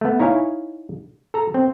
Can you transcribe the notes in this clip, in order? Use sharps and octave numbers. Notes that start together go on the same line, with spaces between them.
A3 B3
D#4 E4 C#5 F5 G#5
A4 A#5
C4